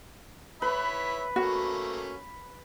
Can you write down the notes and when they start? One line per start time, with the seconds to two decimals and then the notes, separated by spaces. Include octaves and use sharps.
0.62 B4 C#5 E5 B5
1.36 A3 A#3 C#4 F#4